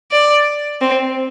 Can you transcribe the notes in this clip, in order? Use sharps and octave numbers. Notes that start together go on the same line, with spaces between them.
D5
C4